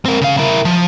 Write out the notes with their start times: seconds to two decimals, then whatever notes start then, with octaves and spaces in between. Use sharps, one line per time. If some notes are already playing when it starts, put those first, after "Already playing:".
0.05 C4 A#4
0.21 C#3 F5
0.37 E4 A#4
0.65 F3